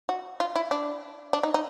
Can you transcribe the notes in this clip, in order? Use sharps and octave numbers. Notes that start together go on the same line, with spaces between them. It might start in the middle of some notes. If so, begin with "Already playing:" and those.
F#4
F4
E4
D4
D4
D#4
D#4